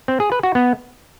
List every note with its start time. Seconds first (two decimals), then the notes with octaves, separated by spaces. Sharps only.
0.08 C4
0.20 G#4
0.32 B4
0.43 F#4
0.55 B3